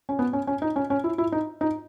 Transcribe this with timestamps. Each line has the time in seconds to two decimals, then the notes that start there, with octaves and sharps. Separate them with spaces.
0.09 C#4
0.19 B3
0.33 C#4
0.47 C#4
0.62 D#4
0.76 C#4
0.90 C#4
1.04 E4
1.18 E4
1.32 D#4
1.61 D#4